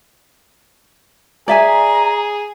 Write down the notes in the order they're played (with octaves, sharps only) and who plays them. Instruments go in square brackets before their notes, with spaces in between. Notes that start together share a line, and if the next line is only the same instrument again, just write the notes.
[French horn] G#4 [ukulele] D5 E5 G#5 [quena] A#5